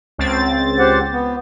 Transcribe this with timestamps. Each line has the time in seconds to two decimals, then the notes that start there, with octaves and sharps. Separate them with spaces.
0.18 C#2 C4 A6
0.79 G4 C5 F#5
1.11 B3